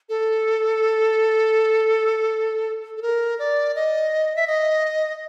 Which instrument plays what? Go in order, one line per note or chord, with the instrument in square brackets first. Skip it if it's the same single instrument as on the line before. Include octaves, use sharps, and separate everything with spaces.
[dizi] A4
A4
A#4
D5
D#5
E5
D#5